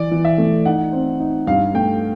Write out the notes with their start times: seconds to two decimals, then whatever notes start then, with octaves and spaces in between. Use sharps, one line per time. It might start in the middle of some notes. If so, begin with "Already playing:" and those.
Already playing: E3 D5
0.11 E3
0.25 E5
0.38 A3
0.65 D#4 F#5
0.93 C4
1.20 D#4
1.47 G2 F5
1.74 A3 G5